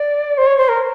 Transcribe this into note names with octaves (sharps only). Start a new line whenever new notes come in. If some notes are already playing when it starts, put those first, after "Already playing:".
Already playing: D5
C5
C#5
C5
A#4